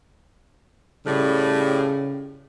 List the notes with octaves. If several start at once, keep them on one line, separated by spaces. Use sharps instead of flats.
A2 C#3 G3